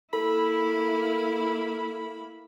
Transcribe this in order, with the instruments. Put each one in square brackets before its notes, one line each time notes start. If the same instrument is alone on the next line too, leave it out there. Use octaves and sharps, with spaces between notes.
[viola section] A#3 E4 [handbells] A4 [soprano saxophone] B5